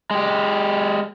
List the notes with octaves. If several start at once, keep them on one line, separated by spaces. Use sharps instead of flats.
G#3 G4